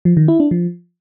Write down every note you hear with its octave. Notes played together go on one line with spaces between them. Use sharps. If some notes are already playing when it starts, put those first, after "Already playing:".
F3
D#3
E4
D4
F3